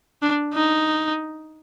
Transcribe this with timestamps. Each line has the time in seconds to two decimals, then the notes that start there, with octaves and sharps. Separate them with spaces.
0.22 D4
0.54 D#4